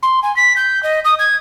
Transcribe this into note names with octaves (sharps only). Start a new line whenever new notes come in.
C6
G#5
B6
G6
D#5
D#6
G#6